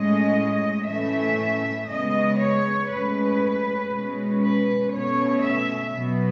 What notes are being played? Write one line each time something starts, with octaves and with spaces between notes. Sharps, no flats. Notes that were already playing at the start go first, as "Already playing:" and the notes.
Already playing: A2 G#3 C#4 D#5
A2 E3 A3 C#4 E5
C#3 G#3 B3 D#5
C#5
A2 G#3 C#4 B4
B2 G#3 C#4
B4
B2 A3 C#4 C#5
E5
B2 F#3 B3